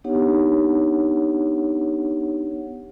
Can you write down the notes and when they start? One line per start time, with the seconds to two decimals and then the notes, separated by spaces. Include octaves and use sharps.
0.04 B3 D4 D#4 G4 C#5 F#5